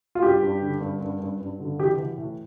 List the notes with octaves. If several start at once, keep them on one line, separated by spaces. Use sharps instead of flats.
F4
G2 G4
G2
D3
G2
G2
G2
G2
D3
E3 G4
E3
A2